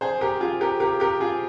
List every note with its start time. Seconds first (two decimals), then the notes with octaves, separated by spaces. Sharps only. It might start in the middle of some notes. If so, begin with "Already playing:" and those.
0.01 G#4 C5
0.21 G4 A#4
0.40 F4 G#4
0.61 G4 A#4
0.80 G4 A#4
1.00 G4 A#4
1.20 F4 G#4